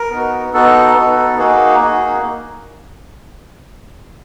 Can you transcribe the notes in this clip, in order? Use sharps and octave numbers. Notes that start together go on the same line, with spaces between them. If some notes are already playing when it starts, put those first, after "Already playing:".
Already playing: A#4
B3 D#4 F#4
B3 D#4 F#4 A4
B3 D#4 F#4
A#3 D#4 F#4 G#4
A#3 D#4 F#4